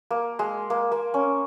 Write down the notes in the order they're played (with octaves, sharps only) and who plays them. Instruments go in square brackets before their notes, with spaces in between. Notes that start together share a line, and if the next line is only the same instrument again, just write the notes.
[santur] A#3
G#3
A#3
A#3
C#4